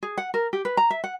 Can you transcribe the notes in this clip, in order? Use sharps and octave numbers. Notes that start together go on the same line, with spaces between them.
G#4
F#5
A#4
G4
B4
A#5
E5
F#5